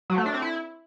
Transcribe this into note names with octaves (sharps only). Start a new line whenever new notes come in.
F#3
A3
D4
C4
E4